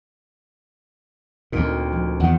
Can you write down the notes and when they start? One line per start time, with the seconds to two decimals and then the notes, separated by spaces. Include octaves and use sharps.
1.52 D2 A#2 C4 D#4 A#4
1.93 F3
2.20 E2 D#3 F4 F#5